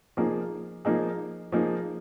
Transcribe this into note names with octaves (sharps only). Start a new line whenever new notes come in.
F3 A#3 D#4 G#4
F3 A#3 D#4 G#4
F3 A#3 D#4 G#4